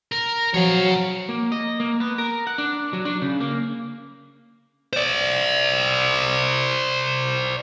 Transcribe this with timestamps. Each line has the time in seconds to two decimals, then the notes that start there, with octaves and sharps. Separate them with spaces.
0.12 A#4
0.54 F3 F#3 C#5 F5
1.29 A#3
1.52 D#5
1.80 A#3
2.00 B3
2.18 A#4
2.47 F#5
2.58 D4
2.93 F#3
3.05 D4
3.22 C#3
3.40 A#3
4.93 C5 D5